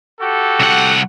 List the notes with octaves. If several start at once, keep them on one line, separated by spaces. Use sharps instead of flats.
F#4 G4 A4
C2 F#5